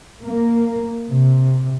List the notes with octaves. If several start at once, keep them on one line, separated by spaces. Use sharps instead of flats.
A#3
C3